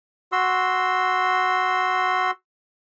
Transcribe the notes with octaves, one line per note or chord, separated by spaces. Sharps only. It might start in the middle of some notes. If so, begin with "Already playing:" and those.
F#4 C6 E6